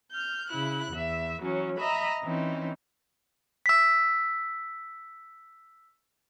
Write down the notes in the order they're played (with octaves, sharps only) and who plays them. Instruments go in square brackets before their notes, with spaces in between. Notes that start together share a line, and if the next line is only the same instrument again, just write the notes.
[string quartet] F6 G6
C#3 E4 F#6
E2 E5
E3 F#3 C#4
D#5 E5 A#5 B5
E3 C4 C#4 D#4
[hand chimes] E6 B6